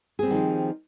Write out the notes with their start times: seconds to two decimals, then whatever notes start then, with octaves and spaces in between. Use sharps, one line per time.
0.19 G#4
0.23 C4
0.27 G3
0.31 D#3
0.34 F3